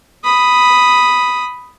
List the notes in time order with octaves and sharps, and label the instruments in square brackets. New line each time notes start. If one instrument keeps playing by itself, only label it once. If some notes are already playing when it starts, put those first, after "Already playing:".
[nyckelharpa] B5 D#6